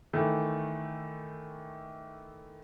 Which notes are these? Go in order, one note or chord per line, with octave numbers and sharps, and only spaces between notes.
D#3 E3 A3